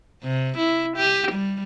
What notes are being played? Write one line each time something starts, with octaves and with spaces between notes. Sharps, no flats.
C3
E4
G4
G3